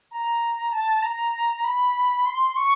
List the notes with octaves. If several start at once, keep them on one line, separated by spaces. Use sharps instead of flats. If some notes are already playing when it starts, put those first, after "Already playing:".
A#5
A5
A#5
B5
C6
C#6